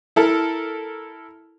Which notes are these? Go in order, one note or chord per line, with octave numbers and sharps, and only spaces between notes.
E4 A4 A#4